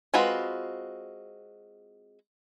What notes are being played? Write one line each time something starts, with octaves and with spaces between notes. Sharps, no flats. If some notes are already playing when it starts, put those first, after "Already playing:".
G#3 C4 F4 F#4 B4